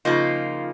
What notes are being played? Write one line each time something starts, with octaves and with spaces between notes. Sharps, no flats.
C#3 F3 A#3 D#4 F4